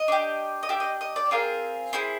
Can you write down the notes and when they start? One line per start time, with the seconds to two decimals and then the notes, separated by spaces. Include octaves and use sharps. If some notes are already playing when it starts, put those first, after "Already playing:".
Already playing: D#5
0.08 D4 G4
0.63 D#5
0.69 D4 G4 E5
0.80 D#5
1.01 D#5
1.16 D5
1.31 C4 F4 G#4 A#4
1.93 C4 E4 G#4